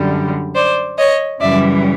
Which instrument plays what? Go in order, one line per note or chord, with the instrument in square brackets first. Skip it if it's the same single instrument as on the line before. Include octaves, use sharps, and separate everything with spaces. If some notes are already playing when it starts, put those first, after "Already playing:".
Already playing: [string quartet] F#2 D3 G3
C5 D5
C#5 D#5
F#2 C#3 E3 G3 D5 E5